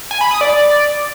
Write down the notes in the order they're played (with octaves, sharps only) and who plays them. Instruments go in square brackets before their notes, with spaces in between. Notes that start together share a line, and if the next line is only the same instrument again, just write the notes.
[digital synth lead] G#5
B5
D#6
D5